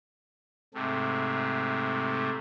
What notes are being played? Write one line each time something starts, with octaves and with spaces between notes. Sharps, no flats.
G#2 C3 A3